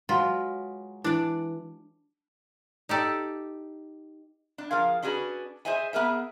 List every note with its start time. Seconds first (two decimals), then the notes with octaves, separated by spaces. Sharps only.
0.09 F#3 G#3 F4 B4
1.04 E3 D4 D5
2.89 D#4 G4 A4 D5
4.58 D4
4.71 F3 G#4 A#4 F5
5.02 C#4 D4 F#4 G#4 A#4 B4
5.65 G#4 C5 D#5 E5 G#5
5.93 B3 G#4 A#4 E5